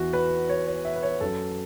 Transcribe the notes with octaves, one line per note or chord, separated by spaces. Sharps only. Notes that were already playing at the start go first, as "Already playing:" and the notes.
Already playing: E2 E3 F#4
B4
C#5
C#5
E5
B4
C#5
F#2 F#3 A4